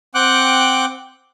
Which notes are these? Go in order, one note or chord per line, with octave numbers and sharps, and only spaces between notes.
C4 F#5 G5 D6 F#6